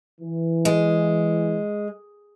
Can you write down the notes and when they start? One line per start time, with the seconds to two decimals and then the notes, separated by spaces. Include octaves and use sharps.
0.21 E3
0.65 G#3